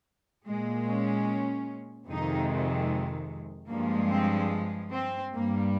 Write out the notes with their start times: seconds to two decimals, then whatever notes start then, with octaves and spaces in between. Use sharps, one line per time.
0.47 A#2 G#3
0.87 C#4
2.08 F2 C3 D#3 G#3 D#4
3.69 G2 F3 G#3 A#3
4.10 C4
4.91 C4
5.30 G2 G3 A#3